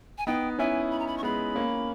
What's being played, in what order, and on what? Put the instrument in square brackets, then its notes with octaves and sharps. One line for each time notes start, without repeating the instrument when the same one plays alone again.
[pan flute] G#5
[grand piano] B3 D#4 [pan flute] G5
[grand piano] C#4 E4 [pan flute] G#5
[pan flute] B5
A#5
B5
C#6
[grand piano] G#3 B3 [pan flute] B5
[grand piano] A#3 C#4